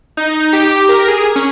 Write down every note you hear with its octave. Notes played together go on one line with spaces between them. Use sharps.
D#4
G4
A#4
G#4
C#4